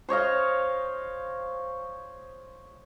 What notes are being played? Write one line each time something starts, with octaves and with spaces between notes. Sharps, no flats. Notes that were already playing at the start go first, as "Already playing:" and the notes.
C5 C#5 D#5 F5